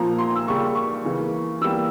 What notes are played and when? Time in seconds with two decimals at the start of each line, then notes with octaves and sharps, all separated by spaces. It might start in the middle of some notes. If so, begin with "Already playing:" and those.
Already playing: A#2 F3 A#3 A#5
0.18 C6
0.35 E6
0.47 C#3 G3 A#3 C#6
0.75 C#6
1.04 C#3 E3 A#3
1.61 E3 G3 A#3 E6